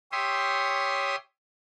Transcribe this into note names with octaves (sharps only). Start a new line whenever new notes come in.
G4 C#5 E5 C6 D#6